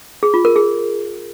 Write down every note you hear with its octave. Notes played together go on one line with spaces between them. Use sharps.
G#4
F4
A#4
G#4